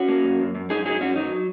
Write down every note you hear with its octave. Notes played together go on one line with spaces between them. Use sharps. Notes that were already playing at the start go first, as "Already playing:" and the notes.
Already playing: C#4 F#4
A#3
F#2
F#2
F#2
F#2 D#4 G#4
F#3 D#4 G#4
F#2 C#4 F#4
F#3 D#4